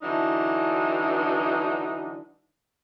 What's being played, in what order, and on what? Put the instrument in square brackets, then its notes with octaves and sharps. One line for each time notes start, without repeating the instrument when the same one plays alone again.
[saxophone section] D3 E3 F#3 D4 D#4